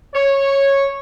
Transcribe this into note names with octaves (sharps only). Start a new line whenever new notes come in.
C#5